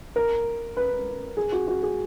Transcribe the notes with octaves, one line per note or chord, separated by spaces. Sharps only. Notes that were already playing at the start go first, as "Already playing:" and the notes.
A#4
B4
G#4
F#4
F#4
G#4